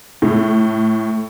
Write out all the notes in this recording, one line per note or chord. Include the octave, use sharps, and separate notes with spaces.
A2